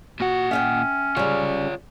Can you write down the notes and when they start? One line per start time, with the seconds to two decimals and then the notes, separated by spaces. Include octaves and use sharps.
0.20 A#2 F#4 F#5
0.51 C#4 E5 F5 G5
1.17 C#3 G3 F4 C#5